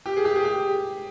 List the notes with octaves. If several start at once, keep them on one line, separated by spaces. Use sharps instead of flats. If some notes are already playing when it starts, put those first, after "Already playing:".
G4
G#4
G4
G#4
G4